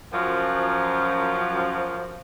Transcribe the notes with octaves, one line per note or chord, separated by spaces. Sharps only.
F#2 F3